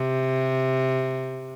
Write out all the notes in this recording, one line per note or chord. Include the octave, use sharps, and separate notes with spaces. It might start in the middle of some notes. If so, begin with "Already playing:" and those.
Already playing: C3